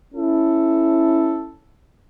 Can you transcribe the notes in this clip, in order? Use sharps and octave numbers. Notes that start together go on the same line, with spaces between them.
C#4 E4 A4